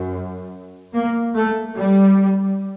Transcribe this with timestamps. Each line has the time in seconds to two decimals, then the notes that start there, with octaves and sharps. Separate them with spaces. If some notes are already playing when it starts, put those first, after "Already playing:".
Already playing: F#2
0.94 A#3
1.35 A3
1.76 G3